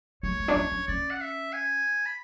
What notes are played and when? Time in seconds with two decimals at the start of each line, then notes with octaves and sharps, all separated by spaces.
0.23 G#3 C#5
0.39 A3
0.48 D4
0.56 C#4
0.72 C#4
0.87 C#4 D5
1.10 F#5
1.20 E5
1.53 G#5
2.06 B5